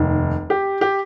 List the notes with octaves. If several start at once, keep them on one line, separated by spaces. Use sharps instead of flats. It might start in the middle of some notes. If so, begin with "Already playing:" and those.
Already playing: F1 D#2 D#3
G4
G4